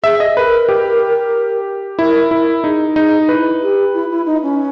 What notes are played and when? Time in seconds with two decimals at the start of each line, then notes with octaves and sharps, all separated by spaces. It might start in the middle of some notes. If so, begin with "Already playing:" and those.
0.04 G#4 E5
0.20 D#5
0.36 A#4 B4
0.69 G4
1.99 E4 A#4
2.31 E4 A#4
2.64 D#4 G#4
2.96 D#4 G#4
3.29 E4 B4
3.62 G4
3.94 E4
4.10 E4
4.26 D#4
4.43 C#4